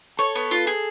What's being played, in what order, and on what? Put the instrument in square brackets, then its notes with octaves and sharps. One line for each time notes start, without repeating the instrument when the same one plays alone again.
[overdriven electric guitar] A4 [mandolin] C#5
[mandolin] B3
F4
G#4